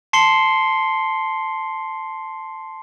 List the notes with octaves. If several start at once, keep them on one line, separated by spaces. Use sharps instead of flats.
A5 C6 C7 C#7 G7